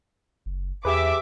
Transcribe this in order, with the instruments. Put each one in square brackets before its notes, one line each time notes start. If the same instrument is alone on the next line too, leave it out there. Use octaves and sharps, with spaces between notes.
[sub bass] F#1
[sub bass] E2 [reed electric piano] G4 G#4 B4 [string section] E5 D6